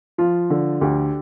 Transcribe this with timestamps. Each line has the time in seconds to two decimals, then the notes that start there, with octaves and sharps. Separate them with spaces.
0.18 F3 F4
0.50 D3
0.81 D2 G4